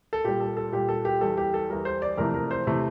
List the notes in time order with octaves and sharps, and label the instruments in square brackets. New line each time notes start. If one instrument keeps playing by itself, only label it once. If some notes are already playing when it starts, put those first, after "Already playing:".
[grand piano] A4
A#2 G3 G4
A4
A4
A#2 G3 G4
A4
G4
E2 E3 G3 A4
G4
A4
E2 E3 G3 A#4
C5
D5
F2 C3 E3 A3 A#4
A#4
C5
C3 E3 A3